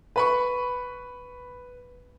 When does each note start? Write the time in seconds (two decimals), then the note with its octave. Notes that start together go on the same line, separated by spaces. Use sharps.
0.16 B4 B5 C#6